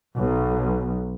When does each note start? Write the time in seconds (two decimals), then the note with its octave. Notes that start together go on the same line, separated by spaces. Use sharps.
0.17 B1